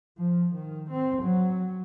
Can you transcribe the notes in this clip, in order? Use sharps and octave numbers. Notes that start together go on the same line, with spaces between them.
F3
D#3
C4
F#3